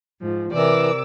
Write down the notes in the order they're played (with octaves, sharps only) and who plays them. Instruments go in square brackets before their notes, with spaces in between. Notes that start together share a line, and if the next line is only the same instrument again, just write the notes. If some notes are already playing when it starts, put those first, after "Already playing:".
[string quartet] G#2 F3
[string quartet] C3 D6 E6 [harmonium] E3 [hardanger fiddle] A#4 D5